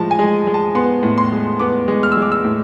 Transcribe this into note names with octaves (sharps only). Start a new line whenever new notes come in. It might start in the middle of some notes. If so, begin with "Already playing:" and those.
Already playing: A2 F3 G#3 A5
G#5
G#3
G#3
A5
B3 C6
A2
C6
G#3
B3 D6
G#3
F6
E6
G#3 D6
E6
A2